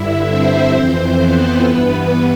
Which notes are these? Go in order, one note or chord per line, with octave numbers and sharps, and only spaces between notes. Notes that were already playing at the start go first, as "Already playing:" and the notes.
Already playing: G2 D3 E4 E5
C4 C5
F2 E3 C4 C5
B3 B4
G2 E3